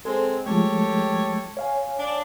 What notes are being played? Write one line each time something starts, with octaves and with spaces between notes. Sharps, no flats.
G#3 C4 A4 C5
F3 G#3 A3 G4 A4 C#5
C#5 F5 G#5
D4